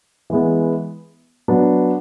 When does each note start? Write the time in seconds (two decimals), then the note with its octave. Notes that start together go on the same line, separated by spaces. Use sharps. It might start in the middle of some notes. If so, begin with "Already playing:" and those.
0.30 E3 G#3 B3
1.48 F#3 B3 D4 F#4